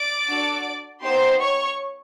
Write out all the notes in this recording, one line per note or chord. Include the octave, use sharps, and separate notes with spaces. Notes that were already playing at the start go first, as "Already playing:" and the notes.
Already playing: D5 D6
D4 F#4 A4
B3 D#4 G4 C5 C6
C#5 C#6